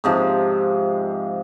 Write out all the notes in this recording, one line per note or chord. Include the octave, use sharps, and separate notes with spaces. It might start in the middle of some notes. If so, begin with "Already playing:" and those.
G#2 C3 F3